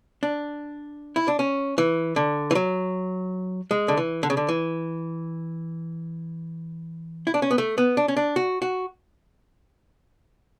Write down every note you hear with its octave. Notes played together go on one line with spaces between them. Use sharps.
D4
E4
D4
C#4
E3
D3
E3
F#3
G#3
D3
E3
D3
C#3
D3
E3
E4
D4
C#4
B3
A3
B3
D4
C#4
D4
F#4
F#4